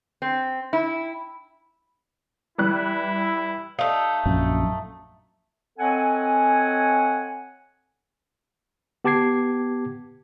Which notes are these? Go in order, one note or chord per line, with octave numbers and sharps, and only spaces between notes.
C4
E4
E3 G3 E4 F#6
A3 D#4 F5
A#1 F#2
C4 A4 C#5 D#5 F#5 G#5
B3 G4 A5 D6 G#6 C7